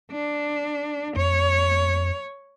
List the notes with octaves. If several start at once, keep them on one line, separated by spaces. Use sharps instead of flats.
D4
F2 C#5